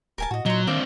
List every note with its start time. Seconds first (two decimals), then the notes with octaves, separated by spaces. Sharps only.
0.18 D1 A#4 G#5 A5
0.31 A2 F#4 D#5
0.46 A#2 F#3 D#4 C5
0.67 D#3 C4 D4 D5 E5 F5